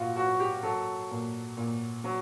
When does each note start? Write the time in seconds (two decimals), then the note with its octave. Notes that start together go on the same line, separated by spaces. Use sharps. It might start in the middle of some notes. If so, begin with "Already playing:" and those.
Already playing: A#2 F4 F#4
0.16 F#3 F#4
0.40 G4
0.63 F#3 A4
1.11 A#2
1.57 A#2
2.04 F#3